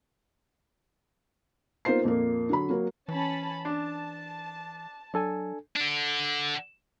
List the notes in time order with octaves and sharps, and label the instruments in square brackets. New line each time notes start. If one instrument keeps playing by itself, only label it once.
[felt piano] A#3 B3 D#4 F4 C5 C7
F2 A#2 A#3
D3 F#3 B5
F#3 A#3
[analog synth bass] E3 [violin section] C#4 A5 B5
[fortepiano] D4 [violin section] A5
[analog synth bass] F#3 [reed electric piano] D4 A4 G#5
[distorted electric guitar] D3 D4